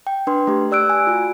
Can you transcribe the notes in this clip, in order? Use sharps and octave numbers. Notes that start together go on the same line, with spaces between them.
G5
D4 B4 C6
A3 G4
G4 D5 E6 F#6 D7
G#5
F4 F#4